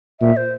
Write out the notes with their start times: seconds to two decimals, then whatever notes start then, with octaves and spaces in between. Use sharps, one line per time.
0.20 A#2 E5
0.37 C5